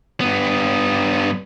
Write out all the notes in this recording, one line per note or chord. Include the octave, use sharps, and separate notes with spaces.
G2 B3